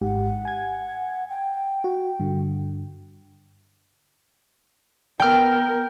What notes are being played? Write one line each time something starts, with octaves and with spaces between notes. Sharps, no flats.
G#1 G#2 G4 F#5
G#5 G#6
G5
F#4
G2 D3
B3 A#4 G5 F6